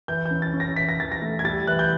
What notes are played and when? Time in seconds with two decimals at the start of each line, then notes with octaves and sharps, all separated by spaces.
0.08 E3 G6
0.26 G6
0.31 C#4
0.42 A6
0.54 C#4
0.60 A#6
0.76 E3 B6
0.89 A#6
0.99 E3 A6
1.12 A#6
1.22 A3
1.39 G#6
1.45 G3 A6
1.67 E3 F#6
1.79 G6